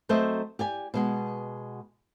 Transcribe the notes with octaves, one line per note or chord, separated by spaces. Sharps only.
F#3 A3 C4 C5 D#5 E5
G4 D5 G#5
B2 G#3 F#4